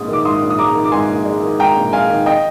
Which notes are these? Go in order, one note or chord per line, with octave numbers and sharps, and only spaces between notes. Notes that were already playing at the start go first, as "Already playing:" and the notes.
Already playing: A#1 G#2 G#3 D#6
D#3
D6
G#2 C6 D#6
A#1
D#6
G#3 A#5 D6
D#3
D6
G#2 G#5 C6
A#1
G#3
D#3
G#2 G5 A#5
A#1
G#3 F5 G#5
D#3
D#5 G5